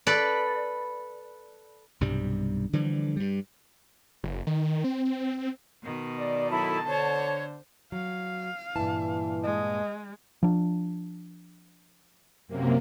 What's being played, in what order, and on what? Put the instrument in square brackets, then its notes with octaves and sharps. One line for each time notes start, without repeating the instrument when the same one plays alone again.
[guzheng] A4 B4 D5
[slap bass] B1 G2 C3 G3
D3 E3 F3 G3
G2 G3
[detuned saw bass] F#1
D#3
C4
[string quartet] B2 D#3
[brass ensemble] D5
[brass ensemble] F#3 A4 [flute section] E4 B5 [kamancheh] A5
[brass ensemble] D3 [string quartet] C5 [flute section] C#5
[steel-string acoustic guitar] F#3 [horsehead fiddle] F5
[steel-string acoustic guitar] G2 A#2 A5 [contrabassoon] E3
[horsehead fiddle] G#3 [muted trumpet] D#5
[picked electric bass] F3 D4
[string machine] F#2 C3 A#3